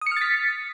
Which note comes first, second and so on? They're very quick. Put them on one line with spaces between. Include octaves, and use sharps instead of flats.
D#6 C#7 F6 A6 B6